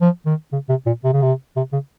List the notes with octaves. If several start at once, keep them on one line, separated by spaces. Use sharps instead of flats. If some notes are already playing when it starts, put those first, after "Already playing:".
F3
D#3
C#3
C3
A#2
C3
C#3
C3
C3
C#3